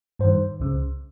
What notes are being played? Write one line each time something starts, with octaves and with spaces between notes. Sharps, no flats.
G2 D#3 C5
C#2 C#3